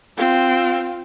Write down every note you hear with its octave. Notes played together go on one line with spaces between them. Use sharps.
C4 F4